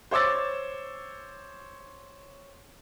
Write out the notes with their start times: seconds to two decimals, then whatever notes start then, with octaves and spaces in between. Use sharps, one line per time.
0.11 C5 C#5 D6 E6 A6